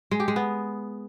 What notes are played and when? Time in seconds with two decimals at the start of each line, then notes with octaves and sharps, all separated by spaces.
0.11 G#3
0.20 G4
0.28 G#3
0.36 B3